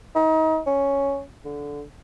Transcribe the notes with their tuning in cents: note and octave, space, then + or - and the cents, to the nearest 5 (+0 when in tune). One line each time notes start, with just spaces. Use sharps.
D#4 +30
C#4 +5
D3 -15